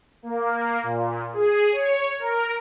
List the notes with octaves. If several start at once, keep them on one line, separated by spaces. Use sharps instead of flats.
A#3
A#2
G#4
C#5
A#4